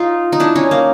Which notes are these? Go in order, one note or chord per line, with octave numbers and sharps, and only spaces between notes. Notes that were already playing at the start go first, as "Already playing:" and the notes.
Already playing: D#4 F4
D#4
D4 E4
C#4 D#4
A#3